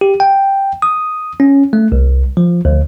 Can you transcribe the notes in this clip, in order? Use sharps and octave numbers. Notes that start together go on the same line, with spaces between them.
G4
G5
D#6
C#4
A3
C2
F3
D2